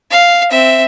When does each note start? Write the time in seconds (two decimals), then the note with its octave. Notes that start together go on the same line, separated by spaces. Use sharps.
0.11 F5
0.51 C4 E5